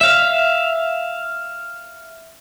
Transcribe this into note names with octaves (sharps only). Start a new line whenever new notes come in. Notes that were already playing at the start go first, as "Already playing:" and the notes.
E5 F5